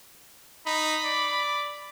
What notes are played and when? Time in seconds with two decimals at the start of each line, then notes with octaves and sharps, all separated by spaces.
0.66 D#4 B5
1.04 D5